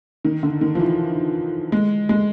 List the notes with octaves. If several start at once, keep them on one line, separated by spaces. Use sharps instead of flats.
D#3
D3
D#3
F3
E3
G#3
G#3